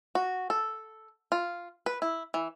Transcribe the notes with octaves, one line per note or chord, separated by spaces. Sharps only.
F#4
A4
F4
B4
E4
E3